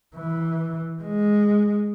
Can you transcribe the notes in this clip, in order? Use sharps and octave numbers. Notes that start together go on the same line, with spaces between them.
E3
G#3